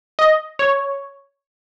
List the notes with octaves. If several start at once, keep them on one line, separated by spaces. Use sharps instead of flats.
D#5
C#5